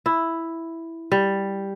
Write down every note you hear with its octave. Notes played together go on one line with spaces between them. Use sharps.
E4
G3